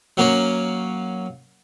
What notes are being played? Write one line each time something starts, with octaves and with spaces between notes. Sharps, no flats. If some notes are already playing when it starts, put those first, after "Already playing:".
F#3 A#3 C#4